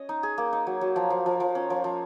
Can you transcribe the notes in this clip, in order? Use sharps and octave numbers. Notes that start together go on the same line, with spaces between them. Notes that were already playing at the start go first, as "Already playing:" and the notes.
Already playing: C#4 D#5
D#4
G#4
A#3
D#4
F#3
F#3
F3
F3
F3
F3
C#4
F3
F3